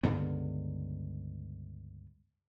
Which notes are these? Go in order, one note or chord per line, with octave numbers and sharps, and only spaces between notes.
C#2 G2 D3 B3